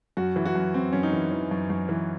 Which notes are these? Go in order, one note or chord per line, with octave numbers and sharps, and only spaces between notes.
F#2 F#4
E3
F#4
F#2
F#2 C4
F#2 C#4
D#4
E3
E3
F#2
F#2
E3